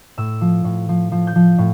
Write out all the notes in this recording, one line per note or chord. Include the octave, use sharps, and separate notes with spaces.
A2 E6
F3
A2
F3
F3
G6
F3
A2